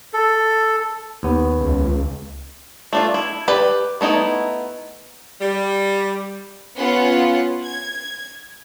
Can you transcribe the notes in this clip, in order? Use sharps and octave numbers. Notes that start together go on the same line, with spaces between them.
A4
D#2 B3
C#2
A3 D4 F4
E4
G4 B4 D5
A3 B3 D#4 E4
G3
B3 C#4 F4 F#5
G#6